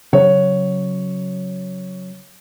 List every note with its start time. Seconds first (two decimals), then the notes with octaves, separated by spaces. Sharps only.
0.13 C#3 F#3 C#5